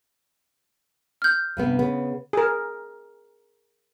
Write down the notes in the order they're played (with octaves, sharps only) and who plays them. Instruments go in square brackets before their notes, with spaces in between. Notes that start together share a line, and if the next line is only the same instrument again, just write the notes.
[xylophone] F6 G6
[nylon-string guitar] G2 C3 B3
C#3 B3
[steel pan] G#4 A#4